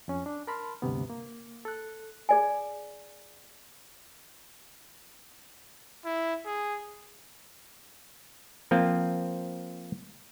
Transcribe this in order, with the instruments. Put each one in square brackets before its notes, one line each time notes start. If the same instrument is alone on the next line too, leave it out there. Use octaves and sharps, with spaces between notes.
[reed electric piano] F2 C#4
D4
A#4 A5 B5 C6 F6
D2 G2 C3 B3
A#3
A4 F#6
[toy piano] G#4 D5 G#5
[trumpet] E4
G#4
[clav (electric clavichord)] F3 A#3 C4 F4